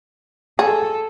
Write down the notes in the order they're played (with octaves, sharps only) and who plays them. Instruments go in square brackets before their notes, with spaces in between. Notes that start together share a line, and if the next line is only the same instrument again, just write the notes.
[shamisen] G#4 [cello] A4